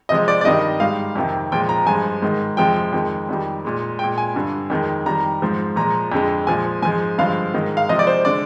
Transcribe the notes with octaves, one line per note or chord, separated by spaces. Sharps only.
C3 F3 G#3 D#5
D5
D5
G2 D#3 G3 D#5
G#2 G3 F5
F2 C3 D#3
A#2 F3 G#3 G5
A#5
G2 F3 G#3 G#5
G#2 D#3 G#3
F2 C3 F3 G#3 G5
F2 D#3 G#3
F2 D#3 G3
A#2 G#3
A#2 G#3 G5
G#5
G2 D3 G3
F2 D#3 G#3
F2 D#3 G3 A#5
G#2 F3 G#3
A#2 F3 G#3 A#5
F2 D3 G#3
A#2 F3 G#3 G#5
G#2 F3 G#3 G#5
G2 D3 F3 G#3 F5
G#2 D#3 G#3
F5
C3 F3 G#3 D#5
D5
C5
D3 G#3 D5